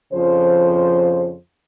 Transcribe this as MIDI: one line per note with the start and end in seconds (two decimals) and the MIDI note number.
0.13 1.34 41
0.13 1.34 49
0.13 1.34 53
0.13 1.34 72